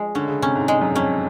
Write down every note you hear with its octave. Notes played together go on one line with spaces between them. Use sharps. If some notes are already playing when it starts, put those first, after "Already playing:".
Already playing: F3 G#3
D3 C#4
C#3
C3 C#4
G#2
G#3
F#2
F2 C#4